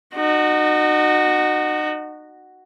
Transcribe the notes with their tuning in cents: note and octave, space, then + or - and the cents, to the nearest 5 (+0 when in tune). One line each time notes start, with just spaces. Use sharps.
D#4 -30 F#4 +0